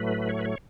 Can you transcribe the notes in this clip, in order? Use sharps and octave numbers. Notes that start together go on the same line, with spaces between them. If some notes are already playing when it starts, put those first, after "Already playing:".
Already playing: A2 F#3 A3 B4
C#5
B4
C#5